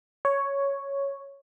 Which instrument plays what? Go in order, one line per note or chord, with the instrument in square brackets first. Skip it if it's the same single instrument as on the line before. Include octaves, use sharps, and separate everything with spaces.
[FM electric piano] C#5